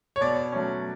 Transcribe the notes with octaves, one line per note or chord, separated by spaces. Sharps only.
C#5
B2 D5
F#3 A3 C#4